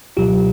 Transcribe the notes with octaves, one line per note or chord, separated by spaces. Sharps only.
C#2 B2 F#3 F4 G4